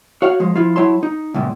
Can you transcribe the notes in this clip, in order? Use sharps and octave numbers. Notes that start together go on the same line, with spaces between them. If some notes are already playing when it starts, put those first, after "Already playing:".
F#4 C#5 F5 F#5
F3 G#3
F3 E4 F4
F#3 E4 C#5 A5 C6
D#4
C#2 F#2 A#2